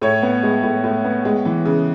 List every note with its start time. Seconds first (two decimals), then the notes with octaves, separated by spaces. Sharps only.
0.02 A2 C#5
0.22 B3
0.43 G#3
0.63 A2
0.84 A2
1.04 B3
1.25 G#3
1.45 E3
1.65 C#3